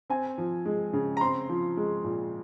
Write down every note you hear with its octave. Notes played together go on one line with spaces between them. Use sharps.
C4 G#5
F3
G#3
C#3
A#5
C4 C6
F3
G#3
A#2